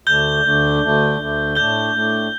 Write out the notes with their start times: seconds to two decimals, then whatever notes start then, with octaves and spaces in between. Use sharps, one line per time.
0.06 D2 D3 A3 D4 G6 G7
0.43 D2 D3 A3 D4
0.81 D2 D3 A3 D4
1.19 D2 D3 A3 D4
1.55 A2 A3 D4 G6 G7
1.93 A2 A3 D4